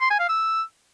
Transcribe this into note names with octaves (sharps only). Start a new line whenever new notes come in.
C6
G#5
F5
E6